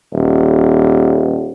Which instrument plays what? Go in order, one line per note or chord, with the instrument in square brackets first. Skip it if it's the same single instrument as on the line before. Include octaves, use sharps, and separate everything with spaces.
[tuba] D#1